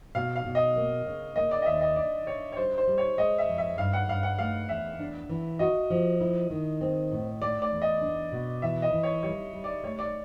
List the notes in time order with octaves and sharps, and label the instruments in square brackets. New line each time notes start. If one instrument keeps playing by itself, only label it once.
[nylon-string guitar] B2 [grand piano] F5
[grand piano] F5
[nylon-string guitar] B2
[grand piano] D#5
[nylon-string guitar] A#3
C#3
[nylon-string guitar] A#3 [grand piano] D#5
[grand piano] D5
D#5
[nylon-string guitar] D#2 [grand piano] E5
[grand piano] D#5
[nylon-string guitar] D3 [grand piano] D5
[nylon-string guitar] D3 [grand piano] C#5
[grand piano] C#5
[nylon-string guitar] G3 [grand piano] C5
[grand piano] C5
[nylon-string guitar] G3
[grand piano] C#5
[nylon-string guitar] G#3 [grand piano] D#5
[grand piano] E5
[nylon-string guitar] F2
[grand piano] E5
[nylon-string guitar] G2 [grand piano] F5
[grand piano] F#5
[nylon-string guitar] G2 [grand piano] F5
[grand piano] F#5
[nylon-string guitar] A3 [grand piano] F5
[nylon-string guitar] E2 [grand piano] E5
[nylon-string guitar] D4
E3
[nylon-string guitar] F#4 [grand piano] D#5
[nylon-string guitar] F3
E4
D#3
C4
A2
[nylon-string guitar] A3 [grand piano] D5
[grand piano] D5
[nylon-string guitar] E2
[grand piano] D#5
[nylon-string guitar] D4
B2
[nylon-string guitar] E3 [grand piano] E5
[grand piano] D#5
[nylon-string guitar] E3
[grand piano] C#5
[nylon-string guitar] G3 [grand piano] C#5
[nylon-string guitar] G3
[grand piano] D5
[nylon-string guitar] A3 [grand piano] C#5
[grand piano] D5